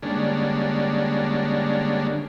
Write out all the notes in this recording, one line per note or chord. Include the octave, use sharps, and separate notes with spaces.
D3 G3 G#3 A#3 C#4 D4